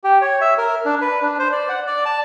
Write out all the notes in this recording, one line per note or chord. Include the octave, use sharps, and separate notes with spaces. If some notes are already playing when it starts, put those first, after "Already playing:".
G4
C#5
E5
A#4
D4
B4
D4
C5
D5
F#5
D5
A5